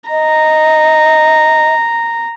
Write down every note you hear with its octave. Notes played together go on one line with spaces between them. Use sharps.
D#5 A#5